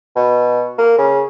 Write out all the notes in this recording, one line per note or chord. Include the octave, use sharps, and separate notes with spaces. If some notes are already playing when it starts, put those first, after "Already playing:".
B2
A#3
C#3